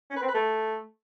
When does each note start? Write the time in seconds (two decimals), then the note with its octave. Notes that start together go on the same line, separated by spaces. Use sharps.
0.10 C#4
0.16 B4
0.22 C4
0.28 B4
0.34 A3